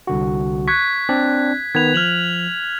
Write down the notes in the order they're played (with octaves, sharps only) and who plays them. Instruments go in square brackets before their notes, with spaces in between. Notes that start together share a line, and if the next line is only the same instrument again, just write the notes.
[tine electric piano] C2 D3 F#4
[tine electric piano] C#6 [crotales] F#6 G#6 B6
[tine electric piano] C4 D4 D5
[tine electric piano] D#3 B3 B4 [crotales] G#6 F7
[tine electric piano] F3 [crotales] F6 F7 F#7